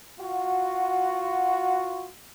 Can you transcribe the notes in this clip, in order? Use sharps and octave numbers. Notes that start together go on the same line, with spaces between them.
F4 F#4